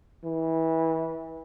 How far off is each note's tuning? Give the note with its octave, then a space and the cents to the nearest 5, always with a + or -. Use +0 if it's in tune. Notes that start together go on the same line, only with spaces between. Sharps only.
E3 -25